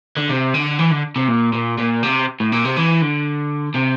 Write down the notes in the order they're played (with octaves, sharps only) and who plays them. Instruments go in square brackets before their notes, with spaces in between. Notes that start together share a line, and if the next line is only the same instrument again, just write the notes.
[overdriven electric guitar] D3
C3
D3
E3
D3
C3
A#2
A#2
A#2
C3
A2
A#2
C3
E3
D3
C3